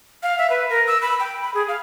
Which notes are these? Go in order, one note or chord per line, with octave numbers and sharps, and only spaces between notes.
F5
E5
B4
A#4
E6
B5
G5
B5
G#4
F5